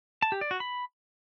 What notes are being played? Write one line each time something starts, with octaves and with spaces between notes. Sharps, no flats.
A5
G4
D5
F#4
B5